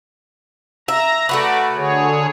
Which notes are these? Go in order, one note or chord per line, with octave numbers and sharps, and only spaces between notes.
E5 A#5
A3 F#4 B4 D5
D3 G#4 C#5